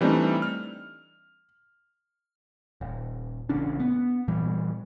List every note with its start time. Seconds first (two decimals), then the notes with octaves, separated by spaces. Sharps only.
0.01 E3 G3 A3 C4 D4 D#4
0.42 F6
2.81 D#1
3.49 A1 C#3 C#4 D4
3.80 B3
4.28 A#2 E3 G3